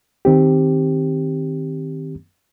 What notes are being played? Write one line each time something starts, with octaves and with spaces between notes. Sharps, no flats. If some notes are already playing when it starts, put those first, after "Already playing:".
D#3 C4 G4